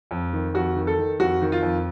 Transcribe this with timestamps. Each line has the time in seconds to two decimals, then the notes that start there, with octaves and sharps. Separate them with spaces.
0.11 F2
0.33 D#3
0.54 F2 F#4
0.76 D#3
0.87 A4
0.98 D#3
1.20 F2 F#4
1.42 D#3
1.52 F4
1.62 F2